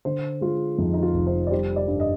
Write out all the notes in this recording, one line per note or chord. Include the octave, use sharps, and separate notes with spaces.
D3 C5
G#3 F4
F2 D#4
D#4
F4
F1
C5
D5
G3 C5
D5
G2
D#5